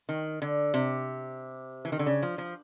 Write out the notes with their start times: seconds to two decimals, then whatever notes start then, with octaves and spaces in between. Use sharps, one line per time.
0.09 D#3
0.42 D3
0.74 C3
1.85 E3
1.92 D#3
1.99 D3
2.06 C#3
2.22 F3
2.38 F3